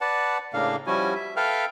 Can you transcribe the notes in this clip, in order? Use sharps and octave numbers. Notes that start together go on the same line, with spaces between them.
B4 D5 F#5 A5
A2 C#3 A#3 D4 F5
F3 G3 C#4 E4 F#4 G#5
E5
A4 B4 E5 F5 G5 F6